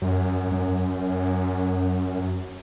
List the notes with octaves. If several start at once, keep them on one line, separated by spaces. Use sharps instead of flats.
F#2
F#2